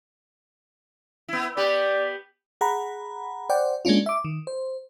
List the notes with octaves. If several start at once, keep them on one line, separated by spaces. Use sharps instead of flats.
B3 E4
B3 G4 B4 D5
G#4 F#5 A#5 B5
C5 D5 F#5 G5
G#3 A#3 C#4 D4 F4
E5 D6
D#3
C5